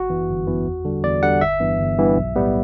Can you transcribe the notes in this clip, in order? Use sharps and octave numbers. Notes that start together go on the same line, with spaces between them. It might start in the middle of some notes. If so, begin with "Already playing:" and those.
Already playing: G1 F#4
F#2 E3 B3
G1
F#2 E3 B3
E2
D3 G3
E2 D5
D3 G3 F#5
G1 E5
G2 E3 B3
G1
G2 E3 B3
B1
A2 G3 B3